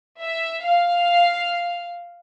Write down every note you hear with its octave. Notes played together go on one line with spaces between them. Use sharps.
E5
F5